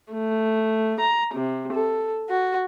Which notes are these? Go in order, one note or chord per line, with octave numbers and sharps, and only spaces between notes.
A3
A#5
C3
A4
F#4